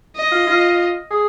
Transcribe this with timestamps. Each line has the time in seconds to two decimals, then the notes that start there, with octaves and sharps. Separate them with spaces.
0.16 D#5
0.32 F4
0.47 F4
1.11 G#4